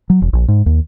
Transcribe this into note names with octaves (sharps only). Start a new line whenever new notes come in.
F#3
E1
A#1
G#2
D#2